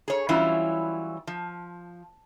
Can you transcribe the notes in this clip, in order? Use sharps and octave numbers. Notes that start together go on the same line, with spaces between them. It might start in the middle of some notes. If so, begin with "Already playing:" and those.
G#4 C#5
E3 F#3 G3 C#4 E4 F4
F3